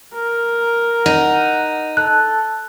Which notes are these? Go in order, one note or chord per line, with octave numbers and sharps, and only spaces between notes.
A#4
D#4 F#5
A4 F#6